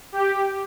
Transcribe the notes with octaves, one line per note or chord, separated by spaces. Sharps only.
G4